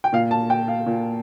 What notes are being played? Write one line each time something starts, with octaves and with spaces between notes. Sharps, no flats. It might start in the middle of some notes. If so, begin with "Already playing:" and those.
G5
A#2 F5
A5
G5
F5
A#2